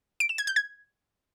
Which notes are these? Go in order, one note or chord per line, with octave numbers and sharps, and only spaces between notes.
D7
E7
G#6
G6
G#6